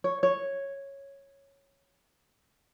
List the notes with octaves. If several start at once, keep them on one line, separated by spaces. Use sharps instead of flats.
C#5
C#5